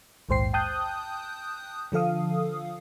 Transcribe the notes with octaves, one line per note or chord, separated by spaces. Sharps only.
A#1 D#2 G#2 C5 G5 C7
G5 A5 D#6 F#6 G6
D3 F3 A4 F5 D#6